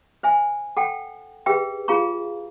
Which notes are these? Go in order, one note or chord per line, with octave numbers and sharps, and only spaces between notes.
C5 E5 G#5
A4 F#5 G5
G4 G#4 B4 E5 G5
F4 G#4 F5 A#5 C#6